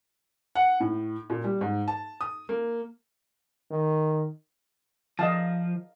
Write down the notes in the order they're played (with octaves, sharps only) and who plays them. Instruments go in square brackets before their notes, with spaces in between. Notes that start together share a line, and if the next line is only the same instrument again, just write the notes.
[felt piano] F#5
A2
A#2
G3
G#2
A5
D#6
A#3
[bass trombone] D#3
[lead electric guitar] F3 [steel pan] D#5 F5 A5